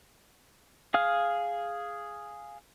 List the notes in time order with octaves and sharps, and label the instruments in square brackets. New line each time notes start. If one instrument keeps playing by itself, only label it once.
[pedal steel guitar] G#4 F5 F6